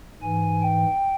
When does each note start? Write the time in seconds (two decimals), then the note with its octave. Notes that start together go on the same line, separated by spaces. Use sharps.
0.21 G#2 E3 G#5
0.62 G5